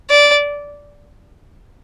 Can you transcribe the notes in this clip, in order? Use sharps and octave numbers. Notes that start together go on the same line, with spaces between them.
D5